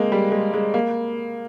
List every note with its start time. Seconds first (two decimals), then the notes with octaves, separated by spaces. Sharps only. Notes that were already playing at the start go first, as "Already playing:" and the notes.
Already playing: G#3 A#3 C4
0.12 G3
0.32 G#3
0.54 G#3
0.74 A#3